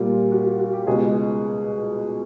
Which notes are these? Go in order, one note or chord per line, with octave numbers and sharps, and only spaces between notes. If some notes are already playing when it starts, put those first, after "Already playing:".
Already playing: A#2 G3 A#3 F4
F#4
F#4
F#4
G4
C#2 B2 G#3 G#4